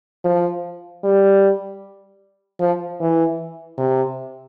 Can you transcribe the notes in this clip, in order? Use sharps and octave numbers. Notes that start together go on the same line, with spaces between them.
F3
G3
F3
E3
C3